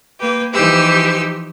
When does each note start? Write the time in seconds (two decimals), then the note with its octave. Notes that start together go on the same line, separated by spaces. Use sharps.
0.20 A#3 G4 B4
0.52 E3 F3 D#4 G4 C5 E6